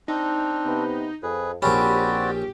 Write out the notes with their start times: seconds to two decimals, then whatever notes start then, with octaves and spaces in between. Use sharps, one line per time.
0.08 C4 D4 D#4
0.65 C3 B3
1.23 F2 G#4 B4
1.62 A#1 C4 C#4 F#4 G4 D5 B5